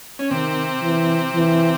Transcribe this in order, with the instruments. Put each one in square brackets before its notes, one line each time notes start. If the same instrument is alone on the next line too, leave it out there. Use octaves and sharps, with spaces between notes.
[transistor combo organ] C#4
[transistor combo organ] C3 C4 [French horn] D#3
[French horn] E3
E3